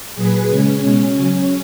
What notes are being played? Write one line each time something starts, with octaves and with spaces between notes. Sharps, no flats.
A#2 F#3 G#4 B4
C#3 G#3 C#4
B2 G#3
C#3 F#3